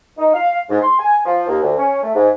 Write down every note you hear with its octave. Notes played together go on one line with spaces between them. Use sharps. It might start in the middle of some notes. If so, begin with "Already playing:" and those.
D#4
F5
G#2
C6
G#5
F3
D#2
D2
C#4
A3
G#2